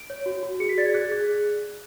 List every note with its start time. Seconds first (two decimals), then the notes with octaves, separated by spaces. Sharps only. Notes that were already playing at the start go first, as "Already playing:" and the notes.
Already playing: D7
0.10 C#5
0.26 F#4
0.43 F#4
0.60 G#4 C#7
0.69 B6
0.78 D5 A6
0.86 G#6
0.94 G#4 F#6
1.12 G#4